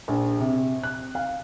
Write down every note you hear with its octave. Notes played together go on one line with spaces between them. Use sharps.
A#1
C3
F#6
F5